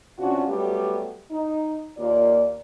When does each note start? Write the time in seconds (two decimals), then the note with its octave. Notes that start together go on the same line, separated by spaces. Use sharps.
0.19 C3 C#4 D4 F4 F#4
0.48 F#3 G3 A3 B3 G4
1.31 D#4
1.98 D#2 A#3 F4 D5